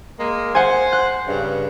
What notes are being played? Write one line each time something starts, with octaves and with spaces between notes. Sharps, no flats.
G#3 A#3
C5 F#5 G#5
F#6
G2 C#3